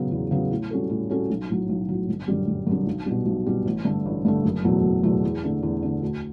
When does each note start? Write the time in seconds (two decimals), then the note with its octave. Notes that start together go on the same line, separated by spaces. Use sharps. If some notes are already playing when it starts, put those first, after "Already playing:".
Already playing: C#3 F#3 B3
0.11 E2
0.31 C#3 F#3 B3
0.51 A2
0.71 G3 C#4 F#4 A4
0.90 A2
1.10 G3 C#4 F#4 A4
1.30 B1
1.49 A2 F#3
1.69 B1
1.88 A2 F#3
2.09 G1
2.28 F#2 D3 G3
2.48 G1
2.67 F#2 D3 G3
2.87 B1
3.06 B2 G3
3.26 B1
3.46 B2 G3
3.65 A1
3.85 G2 D3 A3
4.06 A1
4.25 G2 D3 A3
4.45 F#1
4.64 E2 B2 F#3 A3
4.83 F#1
5.03 E2 B2 F#3 A3
5.23 E2
5.43 D3 A3
5.63 E2
5.83 D3 A3
6.02 D2